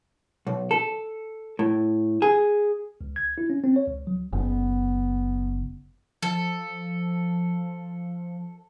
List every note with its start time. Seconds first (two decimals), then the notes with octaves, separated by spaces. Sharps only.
0.47 B1
0.71 A4
1.59 A2
2.22 G#4
3.01 C#2
3.16 G#6
3.38 E4
3.50 C#4
3.64 C4
3.76 C#5
3.88 C#2
4.07 F#3
4.33 F#1 B3
6.22 F3 A4